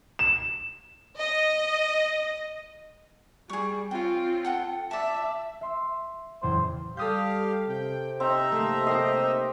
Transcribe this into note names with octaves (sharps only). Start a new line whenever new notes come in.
E7
D#5
G3 G#4 C#6
C4 F4 C#5 G5
A4 F#5 G5
D5 E5 A5
E5 C6 E6
F#1 E2 A#2 C5
G3 G4 A4 F5 D#6 G6
C3 G5
C4 D#4 E5 A#5
A3 A#3
C4 G4 A#4 D#5 C7